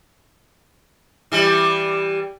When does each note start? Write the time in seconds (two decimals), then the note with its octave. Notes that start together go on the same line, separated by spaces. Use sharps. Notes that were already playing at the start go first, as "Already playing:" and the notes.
1.32 E3 G3